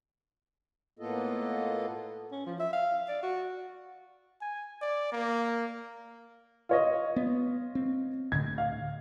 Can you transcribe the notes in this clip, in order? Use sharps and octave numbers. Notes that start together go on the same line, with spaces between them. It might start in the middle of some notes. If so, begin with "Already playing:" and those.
A2 A#3 B3 F4 A4 D#5
C#4
F3
E5
F5
D5
F#4
G#5
D5
A#3
F4 C#5 D#5
B3
C4
D2 A2 D3 G#6
F5